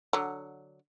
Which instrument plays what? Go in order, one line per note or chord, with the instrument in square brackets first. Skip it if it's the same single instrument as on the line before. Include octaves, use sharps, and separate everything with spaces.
[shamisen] D3 F#3